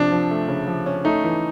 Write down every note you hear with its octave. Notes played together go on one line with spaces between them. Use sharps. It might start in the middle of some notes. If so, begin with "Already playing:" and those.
Already playing: C3 F3 D4
F3
A3
C#3
F3
C#4
A3 D#4
E3